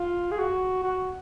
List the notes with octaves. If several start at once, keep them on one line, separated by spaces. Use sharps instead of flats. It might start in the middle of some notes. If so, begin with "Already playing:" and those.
Already playing: F4
G#4
F#4
F#4